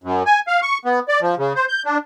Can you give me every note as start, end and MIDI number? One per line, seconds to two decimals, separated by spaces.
0.04 0.23 42
0.26 0.40 80
0.47 0.60 77
0.62 0.78 85
0.85 0.99 59
1.08 1.20 74
1.21 1.35 53
1.38 1.53 49
1.56 1.65 72
1.69 1.82 91
1.85 1.98 62